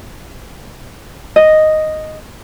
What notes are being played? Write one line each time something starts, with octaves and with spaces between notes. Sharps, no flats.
D#5